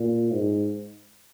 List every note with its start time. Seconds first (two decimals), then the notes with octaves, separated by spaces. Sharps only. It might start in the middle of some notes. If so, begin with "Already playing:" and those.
Already playing: A#2
0.33 G#2